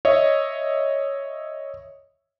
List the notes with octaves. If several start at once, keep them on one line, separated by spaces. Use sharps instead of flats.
C#5 D#5 E5